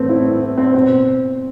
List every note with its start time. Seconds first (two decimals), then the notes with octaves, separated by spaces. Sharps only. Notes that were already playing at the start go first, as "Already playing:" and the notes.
Already playing: A2 E3 A3 B3 C4
0.09 E4
0.42 B3
0.58 C4
0.74 B2 C4